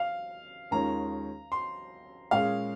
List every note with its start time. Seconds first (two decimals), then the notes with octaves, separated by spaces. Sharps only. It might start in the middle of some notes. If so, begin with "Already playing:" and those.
Already playing: F5
0.71 D#2 D#3 G#3 C#4 F4 A#5
1.52 C6
2.31 A#2 G#3 C#4 G#4 F5